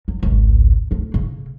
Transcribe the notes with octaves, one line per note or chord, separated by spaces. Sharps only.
F#2
G#1 C#2
D2 D4
C#3